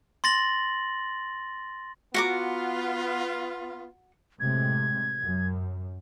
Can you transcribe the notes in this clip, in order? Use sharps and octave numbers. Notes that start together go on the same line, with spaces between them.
C6 A6 A#6 F#7
B3 F4 F#4 A#5 D6
A2 C3 G#3 G#6
F#2